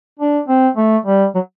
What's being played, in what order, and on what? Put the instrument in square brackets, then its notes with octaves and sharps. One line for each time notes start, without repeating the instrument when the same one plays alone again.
[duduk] D4
C4
A3
G3
F#3